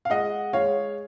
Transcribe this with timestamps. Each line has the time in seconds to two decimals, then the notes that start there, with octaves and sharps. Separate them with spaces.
0.05 F5
0.10 G#3 D#5 F#5
0.53 G#3 C#5 F5